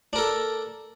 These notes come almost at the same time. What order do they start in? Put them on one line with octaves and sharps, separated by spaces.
D4 A#4 A4